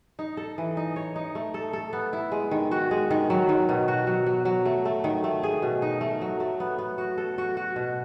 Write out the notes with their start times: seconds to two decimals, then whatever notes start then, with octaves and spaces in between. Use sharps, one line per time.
0.19 D#4
0.37 A4
0.58 E3
0.77 D#4
0.96 C#5
1.16 D#4
1.35 A3
1.54 A4
1.73 A4
1.93 B3
2.13 E4
2.32 G#3
2.51 D#3
2.71 F#4
2.91 G#3
3.11 D#3
3.30 F#3
3.49 D#3
3.69 B2
3.88 F#4
4.07 F#3
4.26 F#3
4.45 F#3
4.65 A3
4.85 A3
5.04 D#3
5.24 A3
5.43 G#4
5.62 B2
5.82 D#4
6.01 A3
6.21 F#3
6.40 A3
6.60 B3
6.79 B3
6.98 F#4
7.18 A4
7.38 F#4
7.57 F#4
7.76 B2